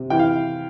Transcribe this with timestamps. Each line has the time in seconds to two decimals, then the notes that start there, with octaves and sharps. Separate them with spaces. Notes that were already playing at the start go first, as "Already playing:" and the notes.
Already playing: C3
0.10 E3 G5
0.19 F5